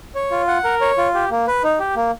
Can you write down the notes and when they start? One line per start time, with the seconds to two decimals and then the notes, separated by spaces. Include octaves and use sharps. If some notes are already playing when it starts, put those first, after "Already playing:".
0.15 C#5
0.31 F4
0.48 F#5
0.64 A#4
0.81 C#5
0.98 F4
1.14 G4
1.31 A#3
1.47 B4
1.64 D#4
1.80 G4
1.96 A#3